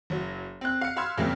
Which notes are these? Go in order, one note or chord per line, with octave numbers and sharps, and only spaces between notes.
F#1 F#3
C4 F#6
F5 C#7
F5 B5 C6 E6 F6 G#6
F2 A#2 C#3 G#3 A#3 C4